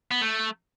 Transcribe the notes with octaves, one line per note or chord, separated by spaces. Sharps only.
B3
A3